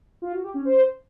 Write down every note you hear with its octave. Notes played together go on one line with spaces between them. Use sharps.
F4
F#4
G4
C#4
C5